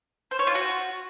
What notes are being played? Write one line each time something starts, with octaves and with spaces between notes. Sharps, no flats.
C5
C#5
F4
F#4